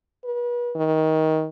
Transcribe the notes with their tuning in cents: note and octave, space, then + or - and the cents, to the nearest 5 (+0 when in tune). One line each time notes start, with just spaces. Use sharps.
B4 -40
D#3 +20